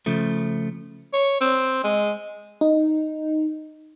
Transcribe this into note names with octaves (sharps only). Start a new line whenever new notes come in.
C#3 F3 A3
C#5
C4
G#3
D#4